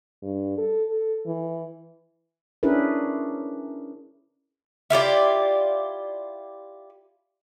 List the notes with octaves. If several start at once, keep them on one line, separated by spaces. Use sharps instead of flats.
G2
A4
A4
E3
C#4 D4 E4 G#4 A#4 B4
E4 F4 G4 D5